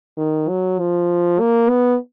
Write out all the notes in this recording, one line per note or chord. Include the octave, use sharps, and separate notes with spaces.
D#3
F#3
F3
A#3
B3